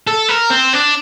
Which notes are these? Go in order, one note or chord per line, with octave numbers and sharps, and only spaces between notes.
A4
A#4
C4
D4